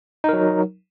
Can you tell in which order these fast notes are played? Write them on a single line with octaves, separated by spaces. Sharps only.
D#4 A#4 F#3